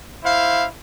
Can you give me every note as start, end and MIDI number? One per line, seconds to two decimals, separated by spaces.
0.24 0.67 64
0.24 0.67 72
0.24 0.67 77